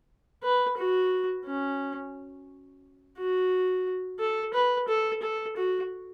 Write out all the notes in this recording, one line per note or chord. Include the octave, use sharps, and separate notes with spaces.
B4
F#4
C#4
F#4
A4
B4
A4
A4
F#4